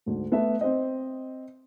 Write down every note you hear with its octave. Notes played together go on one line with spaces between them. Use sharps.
D2 G#2
A3 B3 B4 E5 A5
C4 C5 D#5